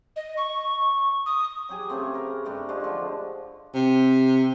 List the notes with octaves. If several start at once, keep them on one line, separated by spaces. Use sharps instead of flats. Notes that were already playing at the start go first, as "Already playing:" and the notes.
D#5
C#6
D#6
F#3 G4 G#4
C#3 A3 C4
A#4 B4
G2 A3 C4
G#3 A3 C4 F4
D3 F3 D4
C3